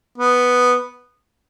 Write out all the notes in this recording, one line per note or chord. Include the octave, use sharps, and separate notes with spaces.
B3